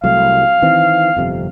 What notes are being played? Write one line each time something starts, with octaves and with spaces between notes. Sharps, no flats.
C2 F#3 A3 F5
D#3 E3 C4
G1 F2 C3